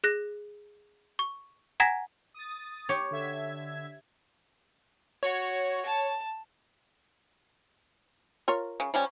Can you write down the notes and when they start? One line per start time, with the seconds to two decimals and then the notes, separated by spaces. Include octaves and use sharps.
0.04 G#4 F#6 A#6
1.19 C#6
1.80 F#5 G#5 A#5 G#6 A#6 B6
2.34 D#6 A6
2.89 G4 C#5
3.11 D3 E5 G#6
5.23 F#4 C#5
5.85 A5
8.48 F4 A#4 C#5
8.80 C#3
8.94 F3 G3 C#4